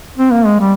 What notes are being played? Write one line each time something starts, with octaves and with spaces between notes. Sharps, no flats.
C4
A#3
G#3
G3